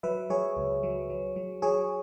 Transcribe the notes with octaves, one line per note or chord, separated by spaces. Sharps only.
F#3 B4 E5
F#3 G#4 C#5
C#2
F#3
F#3
F#3
F#3 G#4 C#5